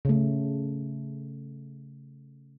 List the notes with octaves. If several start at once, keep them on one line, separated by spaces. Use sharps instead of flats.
C#3 A3